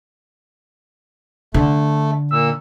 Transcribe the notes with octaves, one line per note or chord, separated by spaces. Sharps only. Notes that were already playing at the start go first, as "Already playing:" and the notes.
D3 A3
A#2 E6